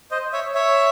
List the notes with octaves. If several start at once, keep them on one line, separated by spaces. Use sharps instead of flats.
C5 D#5
C#5 E5
C#5 E5